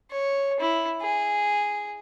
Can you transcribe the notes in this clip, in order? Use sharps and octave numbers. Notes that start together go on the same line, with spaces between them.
C#5
E4
G#4